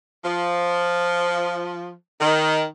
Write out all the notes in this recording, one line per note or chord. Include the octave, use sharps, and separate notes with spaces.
F3
D#3